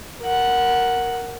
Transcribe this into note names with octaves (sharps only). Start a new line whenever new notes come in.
A#4 F#5